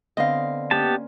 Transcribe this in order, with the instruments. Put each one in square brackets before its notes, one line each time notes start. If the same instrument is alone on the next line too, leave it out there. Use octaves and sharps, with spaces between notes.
[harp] D3 B3 C4 [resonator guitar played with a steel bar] D#5 F5
[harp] A#3 C#4 [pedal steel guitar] B3 G4 A5